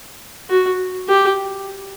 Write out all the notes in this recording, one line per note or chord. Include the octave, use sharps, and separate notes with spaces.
F#4
G4